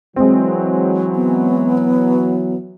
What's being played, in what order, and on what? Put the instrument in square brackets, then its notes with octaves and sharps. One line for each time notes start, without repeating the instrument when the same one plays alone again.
[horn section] E3 F#3 [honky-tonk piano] G#3 C4
[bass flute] B3